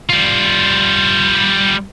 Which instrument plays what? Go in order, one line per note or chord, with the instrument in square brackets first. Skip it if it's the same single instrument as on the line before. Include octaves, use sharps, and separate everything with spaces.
[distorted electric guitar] G3 F4